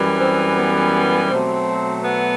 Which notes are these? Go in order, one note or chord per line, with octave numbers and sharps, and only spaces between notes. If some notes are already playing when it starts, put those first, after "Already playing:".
Already playing: F#2 E3 G3
C4
B3
B2 F#3 A3 C4
B3